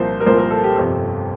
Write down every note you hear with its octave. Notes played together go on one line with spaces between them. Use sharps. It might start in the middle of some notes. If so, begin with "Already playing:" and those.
Already playing: C2 A#2 F3 A#3 C5
A#4
C2 A#2 F3 A#3 C5
A#4
A4
G4
G1 F2 C3 A4